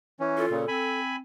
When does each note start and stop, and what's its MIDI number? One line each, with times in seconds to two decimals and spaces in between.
0.20 0.46 52
0.20 0.46 61
0.37 0.58 65
0.37 1.00 69
0.50 0.65 46
0.50 0.65 49
0.68 1.21 60
0.68 1.16 80
0.68 1.16 83